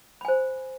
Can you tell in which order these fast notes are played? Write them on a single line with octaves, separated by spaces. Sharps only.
B5 G#5 C5